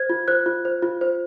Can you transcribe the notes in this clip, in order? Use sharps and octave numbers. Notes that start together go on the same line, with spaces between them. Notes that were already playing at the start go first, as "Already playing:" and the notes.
Already playing: C5 G#6
F4
C5 F#6
F4
C5
F4
C5